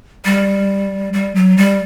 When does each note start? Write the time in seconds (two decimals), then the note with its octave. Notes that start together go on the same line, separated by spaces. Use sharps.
0.25 G3
1.13 G3
1.35 F#3
1.57 G3